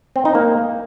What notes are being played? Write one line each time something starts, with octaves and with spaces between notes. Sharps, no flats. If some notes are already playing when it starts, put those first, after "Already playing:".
C4
D#4
A#3